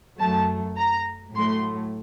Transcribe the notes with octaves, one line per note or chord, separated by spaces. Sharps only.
F#2 F#3 A3 A5
A#5
A2 F#3 A3 C6